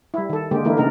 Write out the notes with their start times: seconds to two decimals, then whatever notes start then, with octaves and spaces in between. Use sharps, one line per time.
0.14 G3 E4
0.29 D#3 A4
0.51 D3 G#3 A#3 G4
0.64 D3 E3 A3 A#3 D#4 E4
0.77 C#3 A#3 D4 D#4 A#4